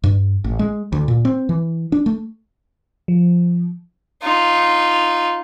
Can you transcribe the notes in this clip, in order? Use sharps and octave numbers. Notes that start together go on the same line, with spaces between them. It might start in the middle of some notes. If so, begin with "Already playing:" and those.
G2
A1
G#3
D2
A#2
C4
E3
D4
A3
F3
D#4 F4